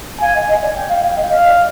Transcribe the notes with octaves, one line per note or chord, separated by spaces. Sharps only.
F5 G#5
D#5
D#5
D5
G5
F5
F5
D#5
D#5 F5
D5